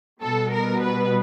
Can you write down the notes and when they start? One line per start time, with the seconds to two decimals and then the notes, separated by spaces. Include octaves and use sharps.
0.23 B2 G3 B3 A4
0.52 A#4
0.81 B4